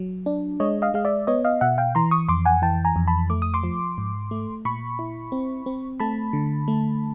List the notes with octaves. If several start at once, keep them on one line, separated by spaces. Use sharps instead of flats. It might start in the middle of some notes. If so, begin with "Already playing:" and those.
Already playing: F#3
D4
G#3 C#5 D#5
D#5 F5
G#3 F5
D5 E5
B3 C#5 D#5
D#5 F5
B2 E5 F#5
F5 G5
E3 A#5 C6
C#6 D#6
F2 C6 D6
F#5 G#5
E3 G5 A5
G#5 A#5
F2
A5 B5
A3 D6
D#6
C6 D6
F3
G#2
A3
A#2 B5 C#6
E4
C4
C4
A3 A5 B5
D3
A3